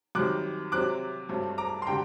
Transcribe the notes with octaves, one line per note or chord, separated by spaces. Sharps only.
F#2 D#3 G3 C4 D6 F#6
C3 F#3 C4 D6 F#6
G2 F#3 A3 C4
A#5 D6
C6
D3 G3 G5 A#5